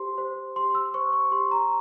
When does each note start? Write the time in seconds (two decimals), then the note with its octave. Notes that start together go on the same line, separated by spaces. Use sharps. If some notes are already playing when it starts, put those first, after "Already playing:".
Already playing: G4 C5 C6
0.18 C5
0.56 G4 C6
0.75 E6
0.94 C5 C#6
1.13 C#6
1.32 G4 C6
1.51 A#5